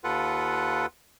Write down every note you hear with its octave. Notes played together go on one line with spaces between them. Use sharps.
D#2 F4 A4 B4 F#5